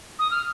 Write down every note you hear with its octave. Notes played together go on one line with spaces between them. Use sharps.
D#6
F6